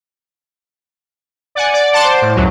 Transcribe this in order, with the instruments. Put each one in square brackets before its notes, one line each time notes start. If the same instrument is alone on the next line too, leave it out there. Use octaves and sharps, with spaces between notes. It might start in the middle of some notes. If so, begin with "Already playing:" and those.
[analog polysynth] D5 F#5 G#5
D5
F#5 A5 C6 D6
C5
A2
C#2 F#2 F#3